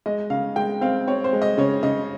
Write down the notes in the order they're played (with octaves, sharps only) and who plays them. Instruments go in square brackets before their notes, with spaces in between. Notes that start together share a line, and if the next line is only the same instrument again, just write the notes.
[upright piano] G#3 D#5
C#3 F5
G#3 G5
C4 F5
C4 C#5
C5
G#3
D#5
C#3 C#5
C#3 D#5